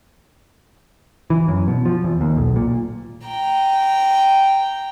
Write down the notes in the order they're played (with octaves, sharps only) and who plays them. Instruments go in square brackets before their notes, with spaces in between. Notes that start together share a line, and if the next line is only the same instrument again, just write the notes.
[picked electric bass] E3
F#2
B2
F3
E2
D#2
B1
A#2
[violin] G5 A#5